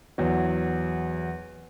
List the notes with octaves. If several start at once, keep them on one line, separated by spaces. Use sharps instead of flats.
E2 F#3